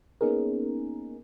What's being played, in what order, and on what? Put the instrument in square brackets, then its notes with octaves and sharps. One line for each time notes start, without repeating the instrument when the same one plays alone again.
[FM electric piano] A#3 B3 C#4 D#4 G#4 A#4